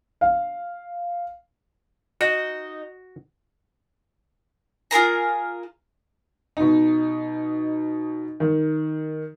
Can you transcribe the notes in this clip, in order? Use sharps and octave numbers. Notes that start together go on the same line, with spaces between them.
F5
D#4 F#4
F4 G#4 A#4 A#5
B2 D#4
D#3